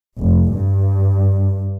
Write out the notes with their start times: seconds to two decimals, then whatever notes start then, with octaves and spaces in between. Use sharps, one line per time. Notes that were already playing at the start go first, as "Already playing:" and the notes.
0.19 F1
0.55 G2